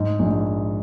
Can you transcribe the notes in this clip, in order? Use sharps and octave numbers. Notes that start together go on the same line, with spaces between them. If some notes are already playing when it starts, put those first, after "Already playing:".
Already playing: G#2 G#3
A#1